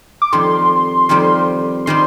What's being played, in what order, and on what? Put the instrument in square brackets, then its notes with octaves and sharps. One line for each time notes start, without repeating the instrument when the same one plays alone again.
[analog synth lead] D6
[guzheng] F2 D#3 G3 C4 [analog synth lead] C6
[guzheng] F2 D#3 G3 C4
[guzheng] D#3 G3 C4 [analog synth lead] C6